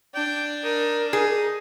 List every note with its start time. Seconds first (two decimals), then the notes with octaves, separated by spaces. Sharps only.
0.15 D4 G5
0.64 D#4 A#4
1.13 D#4 G#4